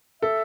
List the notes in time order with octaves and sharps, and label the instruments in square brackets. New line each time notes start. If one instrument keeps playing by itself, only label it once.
[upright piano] A4 [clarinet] E5